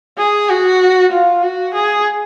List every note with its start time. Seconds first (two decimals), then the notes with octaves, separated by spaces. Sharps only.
0.18 G#4
0.49 F#4
1.12 F4
1.44 F#4
1.74 G#4